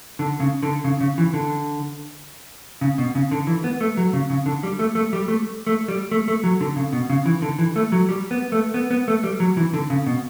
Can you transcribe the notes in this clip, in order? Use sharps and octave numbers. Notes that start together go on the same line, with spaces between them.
D3
C#3
D3
C#3
C#3
E3
D3
C#3
B2
C#3
D3
E3
B3
A3
F#3
C#3
C#3
D3
G3
A3
A3
G3
A3
A3
G3
A3
A3
F#3
D3
C#3
B2
C#3
E3
D3
E3
A3
F#3
G3
B3
A3
B3
B3
A3
G3
F#3
E3
D3
C#3
B2